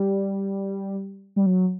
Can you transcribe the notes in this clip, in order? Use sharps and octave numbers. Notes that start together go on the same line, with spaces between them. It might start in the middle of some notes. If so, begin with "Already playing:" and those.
Already playing: G3
G3
F#3